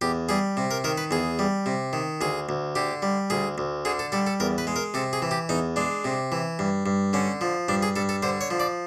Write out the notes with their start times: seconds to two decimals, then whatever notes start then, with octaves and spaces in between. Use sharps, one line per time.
0.01 E2 G4
0.29 G3 G#4
0.57 C3
0.71 A#4
0.84 D#3 A#4
0.98 B4
1.11 E2 G#4
1.39 G3
1.66 C3
1.93 D#3
2.21 D2 G#4
2.49 D2
2.75 D3 G4
3.02 G3
3.30 D2 G#4
3.58 D2
3.85 D3 G#4
3.99 A4
4.12 G3 A4
4.27 A4
4.40 E2 A#4
4.58 B4
4.67 G#3
4.76 A#4
4.94 C3 A4
5.13 G#4
5.22 E3
5.31 G4
5.49 E2 D#4
5.76 G#3 D4
6.05 C3
6.32 E3
6.59 G2
6.86 G2
7.13 D3 C#4
7.41 F3
7.68 G2 D4
7.83 G#4
7.96 G2 A4
8.09 A4
8.23 D3 C5
8.41 C#5
8.50 F3
8.60 D5